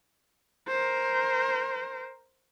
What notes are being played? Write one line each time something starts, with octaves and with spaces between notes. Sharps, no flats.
A#4 C5